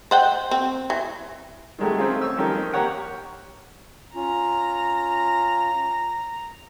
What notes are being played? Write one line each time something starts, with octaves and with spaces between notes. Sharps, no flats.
C5 F#5 G5
C4
E3
D#3 F#3 G#3 A3 G4
A3 C4 C#4 D#4 F4 G#4
C#5 C#6 E6
D#3 F3 C#4 G4 A4
A#3 G4 C#5 F#5 G5
C#4 F4 A#5